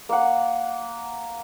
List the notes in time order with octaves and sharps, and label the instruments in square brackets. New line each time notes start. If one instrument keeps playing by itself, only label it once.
[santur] A#3 F#5